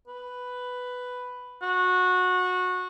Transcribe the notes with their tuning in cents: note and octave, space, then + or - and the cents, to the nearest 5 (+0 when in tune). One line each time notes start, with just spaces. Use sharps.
B4 +5
F#4 -20